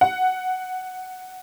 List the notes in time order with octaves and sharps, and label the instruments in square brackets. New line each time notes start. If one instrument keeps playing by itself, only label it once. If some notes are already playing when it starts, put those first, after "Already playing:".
[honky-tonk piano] F#5